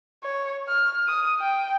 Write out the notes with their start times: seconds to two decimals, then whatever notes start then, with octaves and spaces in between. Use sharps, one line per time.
0.24 C#5
0.68 F6
1.08 D#6
1.40 G5